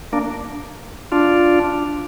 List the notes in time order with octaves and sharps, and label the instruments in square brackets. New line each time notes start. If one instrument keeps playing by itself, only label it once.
[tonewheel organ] A#3 D4
D4 F4